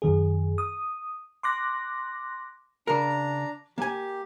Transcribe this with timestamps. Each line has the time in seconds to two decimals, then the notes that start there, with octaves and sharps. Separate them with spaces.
0.02 F#2 D#3 G#4
0.58 D#6
1.43 C6 D6 F#6 A#6
2.87 C#3 D4 A#4 A#5
3.78 A#3 G4 G#5